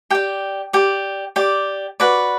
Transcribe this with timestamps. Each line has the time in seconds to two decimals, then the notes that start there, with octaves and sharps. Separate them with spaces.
0.10 G4 D5 G5
0.73 G4 D5
1.36 G4 D5
2.00 F#4 B4 D5